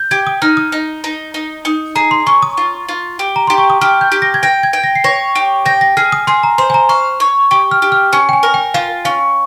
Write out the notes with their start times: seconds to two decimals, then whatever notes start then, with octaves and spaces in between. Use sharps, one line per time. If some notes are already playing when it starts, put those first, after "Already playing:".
Already playing: G6
0.11 G4 G#6
0.27 D#6
0.42 D#4 F6
0.57 D#6
0.72 D#4
1.04 D#4
1.34 D#4
1.65 D#4
1.96 G#4 A#5
2.11 C6
2.27 C#4 C#6
2.42 D#6
2.57 F4
2.89 F4
3.19 G4
3.36 A#5
3.47 G4 C6
3.58 C#6
3.70 D#6
3.81 G4 F6
4.01 G6
4.12 G4
4.22 A#6
4.34 G#6
4.43 G5 A#6
4.63 G#6
4.73 G5
4.84 A#6
4.95 C7
5.04 C#5 A#6
5.35 G4
5.66 G5 A#6
5.81 A#6
5.97 G#4 F6
6.12 D#6
6.27 G#4 C6
6.43 A#5
6.58 C5 C6
6.70 G#5
6.74 A#5
6.89 F5 C#6
7.20 C#5
7.51 G4 C#6
7.71 F6
7.82 G4
7.92 F6
8.13 C#4 G#5
8.29 G5
8.33 G#5
8.43 A#4
8.54 G5
8.74 F4 F5
9.05 C#4 F5